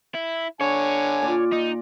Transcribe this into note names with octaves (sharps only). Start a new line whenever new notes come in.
E4
D3 C#5 G#5
A#2 D5
D#4